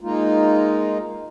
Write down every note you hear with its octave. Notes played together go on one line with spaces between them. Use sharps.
G#3 A#3 D#4 F4